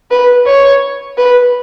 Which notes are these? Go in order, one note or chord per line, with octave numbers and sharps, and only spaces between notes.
B4
C#5
B4